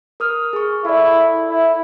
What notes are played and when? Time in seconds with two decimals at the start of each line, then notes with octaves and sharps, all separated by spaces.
0.20 A#4 D#6 F6
0.53 G#4 C#6
0.85 E4 A4 D5
1.49 E4